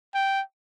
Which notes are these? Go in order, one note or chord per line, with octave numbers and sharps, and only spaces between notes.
G5